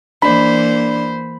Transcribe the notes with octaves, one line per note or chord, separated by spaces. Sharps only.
E3 A#3 D4 C5 D5 B5